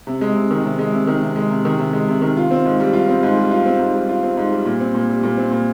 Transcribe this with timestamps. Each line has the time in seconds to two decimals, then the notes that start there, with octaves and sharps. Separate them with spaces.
0.07 C3
0.21 G#3
0.36 C3
0.51 D#3
0.64 C3
0.79 G#3
0.93 C3
1.07 D#3
1.22 C3
1.36 G#3
1.50 C3
1.65 D#3
1.79 C3
1.93 G#3
2.08 C3
2.22 D#3
2.37 F4
2.51 C4
2.65 G#2
2.80 G3
2.93 F4
3.08 C4
3.23 G#2
3.37 G3
3.51 F4
3.66 C4
3.79 G#2
3.94 G3
4.09 F4
4.23 C4
4.37 G#2
4.52 G3
4.66 A#2
4.80 C4
4.95 A#2
5.09 G3
5.23 A#2
5.38 C4
5.52 A#2